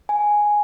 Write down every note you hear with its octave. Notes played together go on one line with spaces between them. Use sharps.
G#5